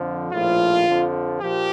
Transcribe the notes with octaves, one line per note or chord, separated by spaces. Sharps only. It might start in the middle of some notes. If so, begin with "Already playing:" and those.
Already playing: F2 D3 F3
A#1 A2 F3 F4
F2 D3 F3
A#1 A#2 F3 G4